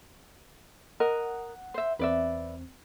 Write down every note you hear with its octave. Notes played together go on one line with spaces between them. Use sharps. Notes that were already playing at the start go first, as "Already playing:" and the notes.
A#4 D#5 F#5
C5 E5
E2 C4 B4 D5 E5